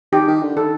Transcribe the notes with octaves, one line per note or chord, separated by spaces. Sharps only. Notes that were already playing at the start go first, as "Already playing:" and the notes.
D#3 G4
D#3
D3
D#3 A4